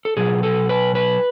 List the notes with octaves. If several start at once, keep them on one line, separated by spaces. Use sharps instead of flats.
A4
B2 F#3 G#4
A4
B4
B4